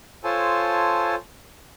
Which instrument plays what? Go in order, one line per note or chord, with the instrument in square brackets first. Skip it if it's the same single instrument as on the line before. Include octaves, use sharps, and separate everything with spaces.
[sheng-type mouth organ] F4 A4 C5 C#5 G#5 A5